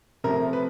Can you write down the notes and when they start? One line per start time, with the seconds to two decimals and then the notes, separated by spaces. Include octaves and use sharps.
0.24 C3 F3 A3 A#4
0.53 B4